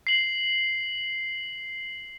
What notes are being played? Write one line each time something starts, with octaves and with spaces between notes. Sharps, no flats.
C7 F#7